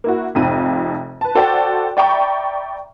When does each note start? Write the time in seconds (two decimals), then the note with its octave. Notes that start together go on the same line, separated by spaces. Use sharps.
0.04 A#3 E4 F#4
0.35 F1 F2 G#2 C3 F4 D#7
1.21 B4 A5
1.35 F#4 A4 C5 D5 G5
1.97 D5 E5 G5 A#5 B5 C#6